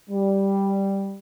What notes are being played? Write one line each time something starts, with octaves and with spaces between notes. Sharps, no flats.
G3